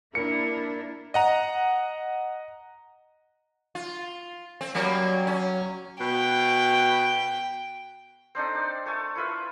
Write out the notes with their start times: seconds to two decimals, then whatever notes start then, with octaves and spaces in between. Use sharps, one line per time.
0.15 A#3 D4 E4 A#4 C#7
1.14 D#5 F#5 A#5
3.75 F4
4.61 C4
4.75 F#3 G3 A#3 C#4
5.27 C#4
6.00 B2 G5
8.35 C4 D4 D#4 A4
8.55 D5
8.86 A3 A4 G#5 D6
9.15 E4 F4 B4 E5